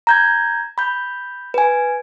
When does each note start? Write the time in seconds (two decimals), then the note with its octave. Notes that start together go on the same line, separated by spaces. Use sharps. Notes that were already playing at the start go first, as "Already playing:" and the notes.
0.07 A#5 G6 G#6
0.78 B5 G6
1.54 B4 G#5